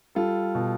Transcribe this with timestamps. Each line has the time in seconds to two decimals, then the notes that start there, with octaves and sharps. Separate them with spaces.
0.15 G3 F4 A4
0.55 B2